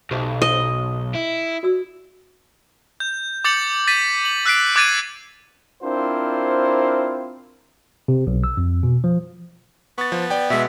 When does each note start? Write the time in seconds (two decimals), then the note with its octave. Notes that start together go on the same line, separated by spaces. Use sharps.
0.11 B1 G4 C5 E5
0.42 D#5
1.14 E4
1.63 F#4 D5 E6
3.00 G6
3.44 D6 G6 A6 C#7 F#7
3.87 A6 B6 D#7
4.25 F#7
4.45 E6 F#6 B6 C7 D7
4.76 D6 F#6 G#6 A6 D7 D#7
5.83 C4 D4 E4 F4 A#4 C5
8.08 C3
8.27 B1
8.44 E6
8.57 F2
8.83 B2
9.04 F3
9.98 B3 C#6 A6
10.12 F3
10.30 D5 G5
10.50 B2 G#3 E5